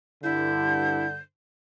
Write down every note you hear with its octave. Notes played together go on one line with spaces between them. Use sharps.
G2 D3 E4 G6